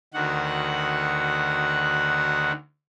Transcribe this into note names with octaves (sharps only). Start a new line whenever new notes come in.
D2 D#3 F#4 F#5